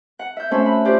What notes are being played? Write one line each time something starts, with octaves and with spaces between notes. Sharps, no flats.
F#5
E5 G6
A3 C#4 F#4 C5 E5
B5
F4 G4 C5 D5